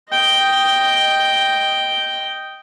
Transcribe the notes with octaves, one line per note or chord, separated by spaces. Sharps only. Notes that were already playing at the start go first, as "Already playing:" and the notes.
D#5 G5